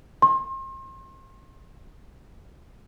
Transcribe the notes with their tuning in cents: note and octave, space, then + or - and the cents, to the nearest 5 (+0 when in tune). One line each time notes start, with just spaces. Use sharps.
C6 +40